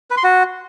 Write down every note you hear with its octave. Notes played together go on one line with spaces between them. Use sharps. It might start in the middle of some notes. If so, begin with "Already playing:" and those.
B4
C6
F#4